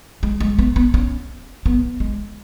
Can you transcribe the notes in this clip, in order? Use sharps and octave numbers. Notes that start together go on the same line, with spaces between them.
G#3
G#3
B3
B3
C#4
B3
G#3